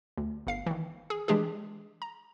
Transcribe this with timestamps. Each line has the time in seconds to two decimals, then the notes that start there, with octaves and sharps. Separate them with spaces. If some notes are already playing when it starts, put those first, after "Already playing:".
0.18 D2
0.47 G1 F5 C7
0.66 D#3 E3
1.10 G#4
1.28 E3 G#3 D4 G4 G#4
2.02 A#5